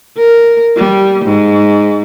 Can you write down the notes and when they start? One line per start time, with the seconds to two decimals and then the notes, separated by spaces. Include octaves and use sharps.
0.17 A#4
0.76 G3
1.25 G#2